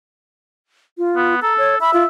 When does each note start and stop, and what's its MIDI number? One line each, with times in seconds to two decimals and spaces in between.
0.98 1.35 65
1.16 1.38 59
1.42 1.76 69
1.42 1.54 82
1.58 1.75 73
1.81 2.07 76
1.81 1.91 83
1.94 2.04 65